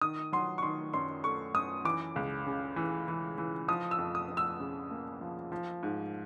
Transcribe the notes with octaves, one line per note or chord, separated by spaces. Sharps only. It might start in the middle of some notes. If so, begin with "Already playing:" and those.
D#3 D#6
F#3 C6
C#6
D#3 C6
F#2 C6
A3 C#6
F#2 D#6
E3 D6
C#2
C#3
E3
E3
E3
F3 D#6
E6
F2
D#6
F2
E6
C#3
A#3
F3
F3
G#2